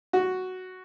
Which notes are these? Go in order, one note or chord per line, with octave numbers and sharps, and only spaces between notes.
F#4